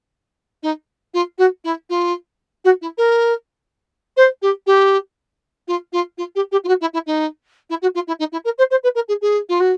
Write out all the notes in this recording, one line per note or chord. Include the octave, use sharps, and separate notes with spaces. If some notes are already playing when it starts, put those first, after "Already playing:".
D#4
F4
F#4
E4
F4
F#4
E4
A#4
C5
G4
G4
F4
F4
F4
G4
G4
F4
F#4
E4
E4
D#4
E4
F#4
F4
E4
D#4
E4
A#4
C5
C5
B4
A#4
G#4
G#4
F4
F#4